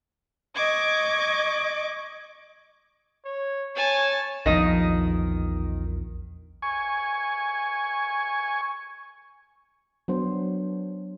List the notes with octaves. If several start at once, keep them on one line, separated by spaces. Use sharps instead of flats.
D#5 C#6 D6 G#6
C#5
C#5 G#5 A5
A#1 E2 D#3 F3 D#5
G#5 C#6
F#3 B3 D4 C5